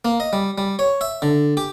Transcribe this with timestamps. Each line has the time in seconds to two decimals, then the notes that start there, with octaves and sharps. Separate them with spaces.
0.05 A#3
0.20 D#5
0.33 G3
0.58 G3
0.79 C#5
1.01 E5
1.22 D3
1.57 G4